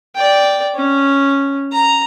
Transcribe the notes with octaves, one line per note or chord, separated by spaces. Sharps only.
D5 G5
C#4
A#5